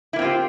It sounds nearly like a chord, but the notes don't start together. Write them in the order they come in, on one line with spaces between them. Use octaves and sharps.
E4 A#3 C4 F4 G4